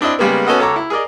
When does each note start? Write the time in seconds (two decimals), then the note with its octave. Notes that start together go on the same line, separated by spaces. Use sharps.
0.01 C4 D4 E4 D#5 E6
0.19 C#3 G3 G#3 A#3 B3
0.47 B3 C#4 F#4 A4 D#5 F#5
0.59 C#2 A4 C#5 A#5 D6
0.76 E4
0.90 G#4 A#4 D5 D#5